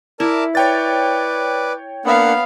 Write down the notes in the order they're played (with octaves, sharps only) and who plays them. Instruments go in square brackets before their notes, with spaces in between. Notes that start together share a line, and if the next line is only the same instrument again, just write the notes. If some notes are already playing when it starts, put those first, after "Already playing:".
[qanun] E4 [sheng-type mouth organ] A#4 D5 A5
[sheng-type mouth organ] B4 D5 [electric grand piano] C#5 G5 A6
[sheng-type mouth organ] A#3 D4 F#5 [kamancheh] B3 F5